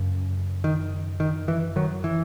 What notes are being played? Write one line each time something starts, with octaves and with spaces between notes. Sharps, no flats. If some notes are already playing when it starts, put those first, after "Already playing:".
Already playing: F#2 C#3
D#3
D#3
E3
D#3 F#3
E3